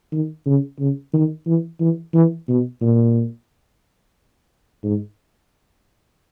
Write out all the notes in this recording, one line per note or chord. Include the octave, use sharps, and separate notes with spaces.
D#3
C#3
C#3
D#3
E3
E3
E3
B2
A#2
G#2